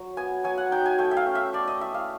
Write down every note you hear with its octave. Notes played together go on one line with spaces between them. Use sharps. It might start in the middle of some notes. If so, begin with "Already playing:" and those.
Already playing: F#3
B3 G#5
F#3 G#5
F#5
D#4 G5
G#5
A3 G5
E5
F5
C#4
E5
A3 D5
D#5
E4 E5
F5